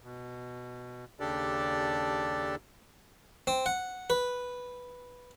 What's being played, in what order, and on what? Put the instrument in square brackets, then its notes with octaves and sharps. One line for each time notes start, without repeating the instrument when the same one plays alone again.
[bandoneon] B2
D#2 C#3 D4 G4 A4 D5
[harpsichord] C4
F#5
B4